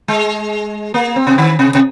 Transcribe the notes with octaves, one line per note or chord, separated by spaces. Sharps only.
G#3
A#3
C4
C3
D#3
C3
C3